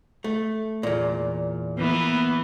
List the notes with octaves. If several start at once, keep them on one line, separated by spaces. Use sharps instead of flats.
A3
E2 A#2
E3 A#3 B3